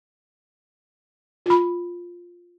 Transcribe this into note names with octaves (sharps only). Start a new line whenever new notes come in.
F4 B5